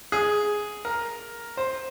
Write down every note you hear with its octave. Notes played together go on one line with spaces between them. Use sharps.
G#4
A#4
C5